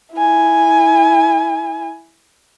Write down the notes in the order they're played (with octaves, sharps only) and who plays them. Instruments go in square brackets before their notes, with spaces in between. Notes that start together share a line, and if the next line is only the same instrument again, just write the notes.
[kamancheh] E4 G#5